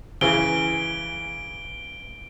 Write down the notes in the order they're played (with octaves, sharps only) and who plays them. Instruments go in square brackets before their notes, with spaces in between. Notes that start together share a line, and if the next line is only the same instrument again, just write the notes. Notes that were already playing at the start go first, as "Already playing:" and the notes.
[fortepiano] C#3 E3 [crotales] D7 G7